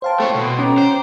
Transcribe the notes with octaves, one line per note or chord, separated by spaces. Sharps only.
C5 F5 G5 A5 C6
A3 A4 C#5
B2
C#4 G5 A#5 D6
C5